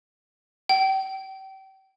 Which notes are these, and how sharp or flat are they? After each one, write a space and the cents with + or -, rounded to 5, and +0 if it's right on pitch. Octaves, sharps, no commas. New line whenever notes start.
G5 -35